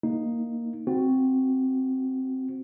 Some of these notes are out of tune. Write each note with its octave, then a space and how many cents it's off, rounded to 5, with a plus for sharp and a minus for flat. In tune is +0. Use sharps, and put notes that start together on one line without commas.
A#3 +0 D#4 +0
C4 +0 F#4 +0